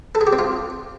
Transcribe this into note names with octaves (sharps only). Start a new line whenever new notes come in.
A4
G#4
G4
C4
F4